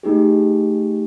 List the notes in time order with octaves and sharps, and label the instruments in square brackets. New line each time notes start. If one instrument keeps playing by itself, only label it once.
[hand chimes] A3 D#4 G4 G#4